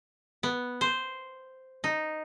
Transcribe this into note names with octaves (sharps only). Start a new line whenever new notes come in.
B3
C5
D#4